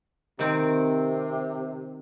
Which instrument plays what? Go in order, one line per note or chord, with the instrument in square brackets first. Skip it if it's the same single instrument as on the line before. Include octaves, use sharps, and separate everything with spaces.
[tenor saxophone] C3 [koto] D#3 C4